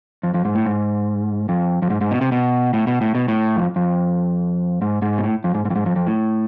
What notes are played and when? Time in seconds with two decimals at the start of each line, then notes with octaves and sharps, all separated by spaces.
0.23 F2
0.34 F2
0.45 G#2
0.55 A2
0.66 G#2
1.49 F2
1.82 F2
1.90 G#2
2.01 G#2
2.11 B2
2.21 C3
2.32 B2
2.74 A2
2.87 B2
3.01 A2
3.15 B2
3.28 A2
3.56 F2
3.76 F2
4.82 G#2
5.02 G#2
5.18 B2
5.23 A2
5.44 F2
5.55 G#2
5.65 G#2
5.70 F2
5.76 G#2
5.86 F2
5.96 F2
6.07 A2